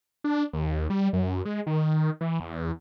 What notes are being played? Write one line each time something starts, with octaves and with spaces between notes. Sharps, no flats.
D4
D#2
G3
F#2
G#3
D#3
E3
E2